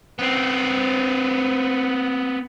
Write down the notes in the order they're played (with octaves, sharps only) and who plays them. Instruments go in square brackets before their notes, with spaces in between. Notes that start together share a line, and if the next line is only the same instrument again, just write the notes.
[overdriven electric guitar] B3 C4